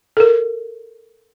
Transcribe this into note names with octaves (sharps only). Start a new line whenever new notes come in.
A4 A#4